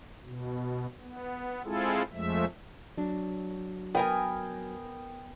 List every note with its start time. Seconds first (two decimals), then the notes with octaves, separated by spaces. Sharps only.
0.25 B2
1.01 B3
1.64 G#3 C4 E4 F4 G#4 A4
2.13 F2 F3 G#3 A3 E5
2.97 F#3 D4
3.95 B3 A#4 G5 G#5